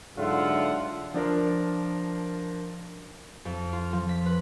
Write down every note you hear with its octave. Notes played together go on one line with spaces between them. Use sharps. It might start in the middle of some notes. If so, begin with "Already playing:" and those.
G#2 D3 F#3 F4 E5 F#5
F3 D4 A#4
F2
F4
F3
B6
B4